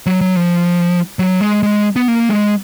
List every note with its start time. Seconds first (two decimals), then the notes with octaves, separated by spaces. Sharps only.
0.06 F#3
0.21 F#3
0.37 F3
1.19 F#3
1.41 G#3
1.63 G#3
1.96 B3
2.08 A#3
2.29 G#3